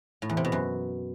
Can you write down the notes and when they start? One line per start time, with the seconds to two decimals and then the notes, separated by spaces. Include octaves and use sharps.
0.22 A2
0.30 E2
0.37 C3
0.45 B2
0.52 F#2